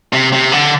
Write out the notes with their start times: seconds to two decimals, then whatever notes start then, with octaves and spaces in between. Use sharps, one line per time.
0.13 C3
0.33 C3
0.52 D3